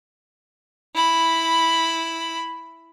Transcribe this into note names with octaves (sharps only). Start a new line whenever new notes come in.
E4 B5